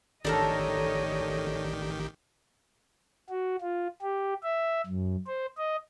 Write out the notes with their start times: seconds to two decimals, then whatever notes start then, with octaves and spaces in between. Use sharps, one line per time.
0.25 A1 D#3 D4 G4 A4 A#4 C#5 D#5
3.29 F#4
3.62 F4
4.02 G4
4.43 E5
4.87 F#2
5.27 C5
5.57 D#5